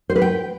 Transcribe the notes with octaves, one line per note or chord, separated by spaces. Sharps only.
C5
B4
G5